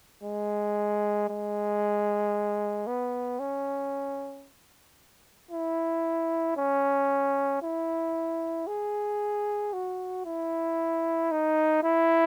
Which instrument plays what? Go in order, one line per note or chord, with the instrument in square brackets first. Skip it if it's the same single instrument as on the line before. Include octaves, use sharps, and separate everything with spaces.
[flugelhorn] G#3
G#3
B3
C#4
E4
C#4
E4
G#4
F#4
E4
D#4
E4